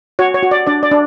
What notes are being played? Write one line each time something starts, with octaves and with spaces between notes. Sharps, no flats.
F#4 C#5
C#5
F#4
D5
D4 D5
D5
D4